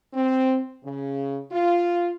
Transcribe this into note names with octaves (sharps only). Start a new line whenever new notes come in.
C4
C#3
F4